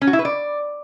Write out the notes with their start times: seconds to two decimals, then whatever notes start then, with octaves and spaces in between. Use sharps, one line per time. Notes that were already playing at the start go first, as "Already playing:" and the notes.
0.02 C#4
0.07 F#4
0.13 E4
0.19 B4
0.25 D5